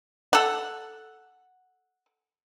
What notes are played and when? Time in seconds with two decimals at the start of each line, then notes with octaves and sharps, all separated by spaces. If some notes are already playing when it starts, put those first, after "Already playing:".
0.33 A4 F#5